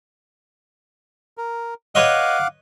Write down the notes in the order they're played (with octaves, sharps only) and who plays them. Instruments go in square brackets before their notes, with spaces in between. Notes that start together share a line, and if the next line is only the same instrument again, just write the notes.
[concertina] A#4
[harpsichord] B4 C#5 D#5 [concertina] F5 F#5 D6